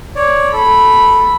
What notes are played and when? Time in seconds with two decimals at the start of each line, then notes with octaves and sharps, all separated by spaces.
0.16 C#5 D5
0.53 A4 B5